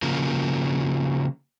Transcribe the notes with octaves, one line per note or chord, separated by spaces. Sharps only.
C#3 F3 A#3